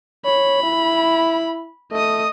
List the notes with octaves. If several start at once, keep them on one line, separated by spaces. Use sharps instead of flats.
C#5 B5
E4
A3 D#5 D#6